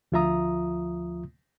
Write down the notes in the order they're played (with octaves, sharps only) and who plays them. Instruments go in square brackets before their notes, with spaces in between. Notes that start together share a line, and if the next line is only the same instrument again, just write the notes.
[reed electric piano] D2 F3 F4 E5 A#5 D#6